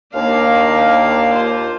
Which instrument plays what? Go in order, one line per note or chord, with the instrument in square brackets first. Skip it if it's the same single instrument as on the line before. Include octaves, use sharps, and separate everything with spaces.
[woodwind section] D#2 A#3 [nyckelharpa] D4 F5
[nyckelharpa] F4 C5